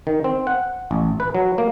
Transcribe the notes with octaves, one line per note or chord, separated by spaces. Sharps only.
D#3
C4
F#5
A1
B4
F#3
A#3